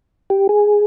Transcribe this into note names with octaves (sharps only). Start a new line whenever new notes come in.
G4
G#4